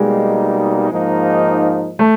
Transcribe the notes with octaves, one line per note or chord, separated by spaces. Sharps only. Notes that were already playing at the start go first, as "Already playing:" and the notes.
Already playing: B2 G3 G#3 A#3 D#4
G#2 F3 A#3 D#4
A3